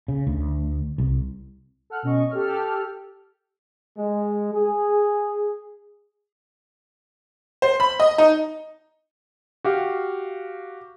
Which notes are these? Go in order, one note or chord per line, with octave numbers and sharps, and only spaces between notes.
C#3
D2
C2
A4 F#5 F6 F#6
B2 C#4 D#5 C#6
G4 A4 F6
G#3
G#4
C5
B5
D#5
D#4
F#4 G4 F5